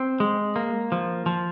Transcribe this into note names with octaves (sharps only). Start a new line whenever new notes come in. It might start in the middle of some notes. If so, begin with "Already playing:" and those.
Already playing: C4
G#3
A#3
F3
F3